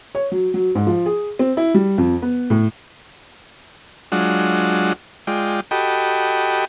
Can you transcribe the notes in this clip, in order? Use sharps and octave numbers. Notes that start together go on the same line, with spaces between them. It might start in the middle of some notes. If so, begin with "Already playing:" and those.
C#5
F#3
F#3
G#2
F3
G#4
C4
E4
G3
F2
B3
A2
F#3 G#3 D4 F4 F#5
G#3 F4 D5 G5
F#4 G4 A4 D#5 G5 B5